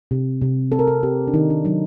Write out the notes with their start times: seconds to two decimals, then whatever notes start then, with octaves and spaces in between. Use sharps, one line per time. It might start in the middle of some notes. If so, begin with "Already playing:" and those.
0.11 C3
0.41 C3
0.72 C4 A4
0.79 A#4
0.87 A4
1.03 C4 G4
1.28 D4
1.33 D#3 D#4
1.50 D4
1.65 F#3 D#4